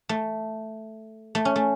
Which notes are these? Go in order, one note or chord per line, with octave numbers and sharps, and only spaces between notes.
A3
A3
C#4
A3